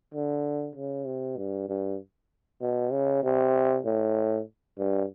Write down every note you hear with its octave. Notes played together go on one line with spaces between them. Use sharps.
D3
C#3
C3
G2
G2
B2
C#3
C3
A2
G2